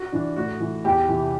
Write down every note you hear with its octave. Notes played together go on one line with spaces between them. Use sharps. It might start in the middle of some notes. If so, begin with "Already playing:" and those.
Already playing: F#4
E3 D4
A2 F#4
E3
E2 G4
C3 E3